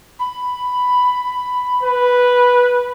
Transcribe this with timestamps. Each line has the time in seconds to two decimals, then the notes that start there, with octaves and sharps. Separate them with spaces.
0.19 B5
1.83 B4